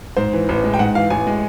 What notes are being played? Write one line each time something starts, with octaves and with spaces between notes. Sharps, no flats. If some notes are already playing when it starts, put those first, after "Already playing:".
G#2 C5
E3
A1
G#3
G5
G#2 F#5
E3 F5
A1 G#5
G#3